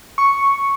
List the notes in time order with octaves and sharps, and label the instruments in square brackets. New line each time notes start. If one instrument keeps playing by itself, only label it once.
[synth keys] C#6